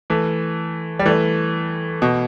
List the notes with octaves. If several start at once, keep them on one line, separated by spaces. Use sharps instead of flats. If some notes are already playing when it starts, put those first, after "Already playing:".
E3 A3
G3
E3 A3
B2